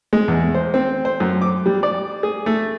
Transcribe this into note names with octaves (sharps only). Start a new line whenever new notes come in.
G#3
E2
C5
C4
C5
F#2
D6
G3
D5
G#4
A3